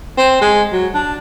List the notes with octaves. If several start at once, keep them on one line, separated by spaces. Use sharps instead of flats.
C4
G#3
F#3
D4